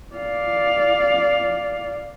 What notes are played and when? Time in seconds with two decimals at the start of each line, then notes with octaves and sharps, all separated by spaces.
0.15 D5 F5